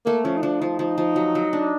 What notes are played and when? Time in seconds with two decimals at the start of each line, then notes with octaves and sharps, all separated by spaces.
0.06 A3 A#3
0.24 F3 C#4
0.37 D#4
0.42 F3 D4
0.61 F3 D#4
0.79 F3
0.98 F3
1.16 F#3
1.35 F#3
1.53 D4